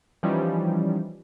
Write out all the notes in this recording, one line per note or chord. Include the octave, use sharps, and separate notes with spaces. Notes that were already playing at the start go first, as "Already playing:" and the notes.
E3 F3 G3 C#4 D#4